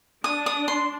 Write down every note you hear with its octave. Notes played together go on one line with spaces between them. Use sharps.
D4 D#6
D#6
C6